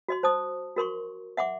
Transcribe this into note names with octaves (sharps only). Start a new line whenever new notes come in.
F#4 D#5 C6
C5 A5 D#6
F#4 A#4 C6 C#6
E5 F#5 C6 D6